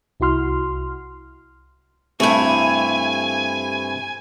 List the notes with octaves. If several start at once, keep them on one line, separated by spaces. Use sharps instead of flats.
C2 E4 F#4 C6 F6
G2 C3 A3 E4 G#5